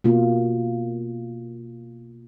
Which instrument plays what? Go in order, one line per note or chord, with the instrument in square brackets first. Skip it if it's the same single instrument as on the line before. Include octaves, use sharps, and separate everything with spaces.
[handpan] B2 A#3 F4